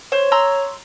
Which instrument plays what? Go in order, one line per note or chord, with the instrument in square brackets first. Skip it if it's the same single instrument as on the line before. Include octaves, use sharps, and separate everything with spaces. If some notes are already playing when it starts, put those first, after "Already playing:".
[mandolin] C5 [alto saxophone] C#5
[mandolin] A#5 C6 E6